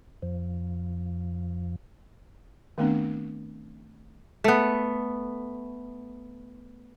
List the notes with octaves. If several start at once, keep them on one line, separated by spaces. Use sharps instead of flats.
F2 F3
D#3 A3 B3 C4 D4
A3 B3